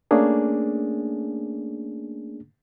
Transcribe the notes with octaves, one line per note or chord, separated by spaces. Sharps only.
A3 A#3 C#4 D4 G#4